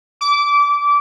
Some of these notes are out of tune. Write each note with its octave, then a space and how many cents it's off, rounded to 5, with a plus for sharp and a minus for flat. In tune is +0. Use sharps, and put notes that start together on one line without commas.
D6 -20